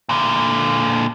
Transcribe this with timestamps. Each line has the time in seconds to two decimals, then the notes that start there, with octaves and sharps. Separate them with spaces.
0.09 A#2 D3